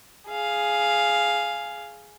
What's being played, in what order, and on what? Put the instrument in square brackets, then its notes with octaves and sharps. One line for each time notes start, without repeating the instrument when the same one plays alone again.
[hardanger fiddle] G#4 F5